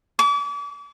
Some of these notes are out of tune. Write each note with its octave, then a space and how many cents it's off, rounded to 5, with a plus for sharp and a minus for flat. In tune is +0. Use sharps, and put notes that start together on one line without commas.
D6 -40